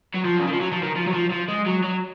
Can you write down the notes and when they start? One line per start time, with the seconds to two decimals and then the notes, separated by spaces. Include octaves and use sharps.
0.14 F#3
0.24 F3
0.39 C#3
0.46 D#3
0.53 F3
0.60 F#3
0.72 F3
0.83 D#3
0.96 F3
1.07 F#3
1.13 F3
1.31 F3
1.48 G#3
1.66 F#3
1.83 F#3